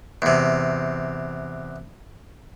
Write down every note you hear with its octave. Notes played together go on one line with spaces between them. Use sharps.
E2 C3